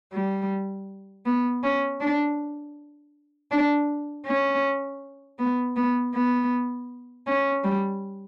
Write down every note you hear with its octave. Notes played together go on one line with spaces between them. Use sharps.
G3
B3
C#4
D4
D4
C#4
B3
B3
B3
C#4
G3